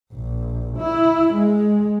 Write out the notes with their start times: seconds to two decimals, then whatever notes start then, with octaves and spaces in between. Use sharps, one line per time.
0.13 A#1
0.78 E4
1.34 G#3